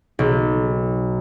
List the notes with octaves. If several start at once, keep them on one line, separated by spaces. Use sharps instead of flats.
B1